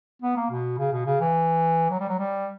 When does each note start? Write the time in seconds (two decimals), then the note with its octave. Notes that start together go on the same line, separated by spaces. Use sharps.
0.22 B3
0.36 A#3
0.50 B2
0.78 C#3
0.92 B2
1.06 C#3
1.20 E3
1.90 F#3
2.00 G3
2.08 F#3
2.18 G3